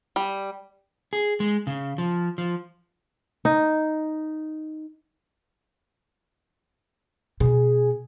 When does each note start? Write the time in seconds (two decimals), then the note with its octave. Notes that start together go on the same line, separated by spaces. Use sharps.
0.16 G3
1.13 G#4
1.40 G#3
1.67 C#3
1.98 F3
2.38 F3
3.45 D#4
7.40 B2 G#4